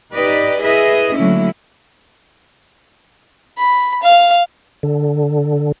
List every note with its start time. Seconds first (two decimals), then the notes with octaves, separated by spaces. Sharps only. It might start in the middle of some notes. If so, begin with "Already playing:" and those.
0.13 D#4 G4 B4 D5 D#5
0.62 E4 G#4 B4 D#5 E5
1.16 D3 F#3 A3 A#3 C#4 E4
3.58 B5
4.03 F5
4.83 D3